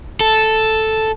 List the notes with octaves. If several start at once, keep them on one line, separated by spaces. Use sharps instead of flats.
A4